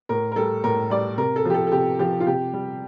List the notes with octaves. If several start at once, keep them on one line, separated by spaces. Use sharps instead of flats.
A2 A#4
A#4
G3 A4
A2 A#4
G3 D5
C3 A#4
A4
F3 G4
A4
A4
C3 G4
F3 G4
F4
C3 G4
G3